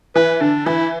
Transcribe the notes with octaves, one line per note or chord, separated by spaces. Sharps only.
E3 B4
D3 D4
E3 E4